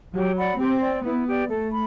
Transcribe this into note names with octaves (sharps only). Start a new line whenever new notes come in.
F#3 G4
D5 F#5 B5
C4 G4
D5 G5
B3 E4
G4 D5
A3 A4
B5